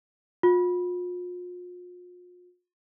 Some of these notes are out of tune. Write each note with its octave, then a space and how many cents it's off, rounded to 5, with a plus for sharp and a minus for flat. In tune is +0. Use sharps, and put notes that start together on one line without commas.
F4 +40